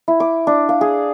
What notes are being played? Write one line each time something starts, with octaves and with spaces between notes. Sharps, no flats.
E4
D6
D4
F5
G#4